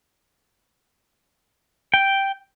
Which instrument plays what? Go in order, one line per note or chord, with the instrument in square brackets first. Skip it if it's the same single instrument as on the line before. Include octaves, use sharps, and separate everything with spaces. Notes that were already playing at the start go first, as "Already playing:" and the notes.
[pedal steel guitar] G5